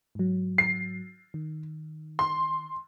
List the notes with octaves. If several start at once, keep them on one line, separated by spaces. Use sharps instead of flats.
G#2 F#3
C7
D#3
C6